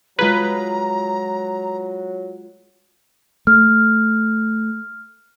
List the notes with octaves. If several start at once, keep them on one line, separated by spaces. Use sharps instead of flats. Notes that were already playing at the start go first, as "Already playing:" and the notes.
F#3 G#3 F4 G#4 B4 A#5
A3 F6